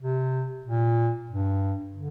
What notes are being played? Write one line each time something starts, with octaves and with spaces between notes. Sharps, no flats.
C3
A#2
G2
D3